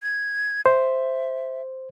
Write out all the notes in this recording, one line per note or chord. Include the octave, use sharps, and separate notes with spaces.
G#6
C5 E5